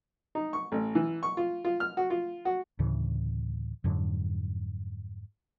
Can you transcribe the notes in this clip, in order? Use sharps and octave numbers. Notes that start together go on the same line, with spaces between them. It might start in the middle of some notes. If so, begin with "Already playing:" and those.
D#4
C#6
A1
E3
C#6
F4
F4
F6
F#4
F4
F#4
D2 A2 C#3 E3
F2 G#2 D3 F#3